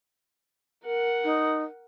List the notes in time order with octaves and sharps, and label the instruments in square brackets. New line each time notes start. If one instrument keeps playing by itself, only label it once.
[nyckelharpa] A#4 F#5
[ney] D#4